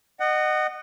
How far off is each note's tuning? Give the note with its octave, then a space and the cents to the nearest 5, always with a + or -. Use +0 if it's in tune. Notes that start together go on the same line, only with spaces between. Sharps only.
D#5 -25 F#5 +15